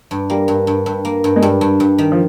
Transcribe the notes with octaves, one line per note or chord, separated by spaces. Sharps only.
G2
G3 A#3
G2
G2
G2
A#3
G2
G#3
G2 G3
G2
G2
D#3
F3